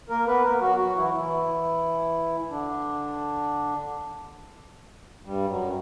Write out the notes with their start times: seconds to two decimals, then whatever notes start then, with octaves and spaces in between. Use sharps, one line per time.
0.09 A#3 A#4
0.27 B3 B4
0.44 A#3 A#4
0.60 F#3 F#4
0.78 F#3 F#4
0.95 E3 E4
1.12 E3 E4
2.50 D3 D4
5.25 G2 G3
5.48 F#2 F#3